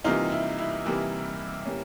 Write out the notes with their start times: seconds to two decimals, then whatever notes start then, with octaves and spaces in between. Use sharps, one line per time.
0.04 C3 E3 G3 A#3 D#4 F4
0.32 E4
0.59 E4
0.86 C3 E3 G3 A#3
1.65 E3 G3 A#3 C#4